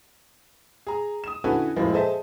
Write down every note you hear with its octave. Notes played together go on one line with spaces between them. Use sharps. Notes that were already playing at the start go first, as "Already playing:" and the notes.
G#4 A#5
D#6 E7
D3 C#4 E4 F#4 A4 B4
F#2 A2 F3 G#3 A#3
G#4 A4 C5 D#5 E5 A5